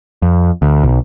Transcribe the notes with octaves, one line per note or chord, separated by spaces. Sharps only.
F2
D2
B1